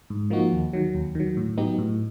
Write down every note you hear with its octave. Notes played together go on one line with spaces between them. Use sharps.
G#2
F3 A#3 D#4 F#4
D#2
D#3 F#3
D#2
D#3 F#3
A2
F#3 B3 D#4 G4
A2